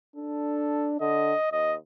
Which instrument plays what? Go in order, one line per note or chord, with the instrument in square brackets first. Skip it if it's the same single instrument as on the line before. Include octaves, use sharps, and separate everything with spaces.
[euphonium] D4 [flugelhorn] A4
[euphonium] D3 [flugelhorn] D#5
[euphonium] D#2 [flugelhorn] D#5